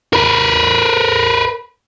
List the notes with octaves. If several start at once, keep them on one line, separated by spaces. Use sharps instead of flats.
A#4 B4